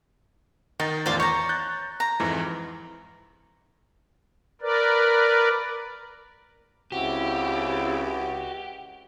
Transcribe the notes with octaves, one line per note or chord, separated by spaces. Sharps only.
D#3 D#4 A6
A1 E2 F4 C5 D5
C#5 A#5 G6 C#7
F#6 G6 A6
A#5
F2 G#2 E3
A#4 B4 D5
C#2 C#3 C4 E4 F#4 G4